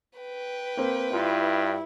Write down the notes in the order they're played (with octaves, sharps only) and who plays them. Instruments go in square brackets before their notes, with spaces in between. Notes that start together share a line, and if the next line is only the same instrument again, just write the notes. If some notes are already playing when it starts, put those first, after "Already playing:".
[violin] B4 G5
[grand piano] A#3 C4
[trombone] G2 [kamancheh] E4 [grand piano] F4